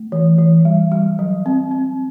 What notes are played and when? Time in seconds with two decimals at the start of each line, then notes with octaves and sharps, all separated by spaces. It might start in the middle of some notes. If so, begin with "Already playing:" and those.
Already playing: A3
0.12 E3
0.38 E3
0.65 G3
0.92 G3
1.19 F#3
1.46 C4
1.71 C4